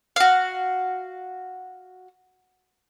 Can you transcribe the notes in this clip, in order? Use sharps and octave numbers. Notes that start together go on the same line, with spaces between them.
F#4 F5